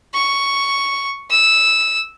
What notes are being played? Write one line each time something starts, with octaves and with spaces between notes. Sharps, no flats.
C#6
E6